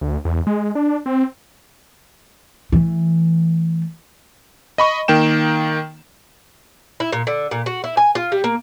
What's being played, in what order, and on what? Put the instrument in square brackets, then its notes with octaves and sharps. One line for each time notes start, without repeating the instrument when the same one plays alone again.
[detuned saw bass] D2
E2
G#3
D4
C4
[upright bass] E3 A3
[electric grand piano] D#5 B5 C#6
D#3 A#3 G5 E7
[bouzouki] E4
A#2
D3
A#2
F#4
E4
G#5
F4
G3
A#3